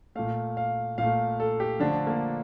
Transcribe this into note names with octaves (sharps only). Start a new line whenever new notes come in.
A#2 A3 F5
F5
A#2 A3 F5
A4
G4
D3 F3 A3 D4
A#3